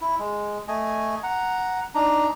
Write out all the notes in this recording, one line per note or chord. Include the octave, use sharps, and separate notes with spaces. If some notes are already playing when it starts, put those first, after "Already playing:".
E4
G#3
A3 D#5 G#5
F#5 A#5
D4 D#4 A#5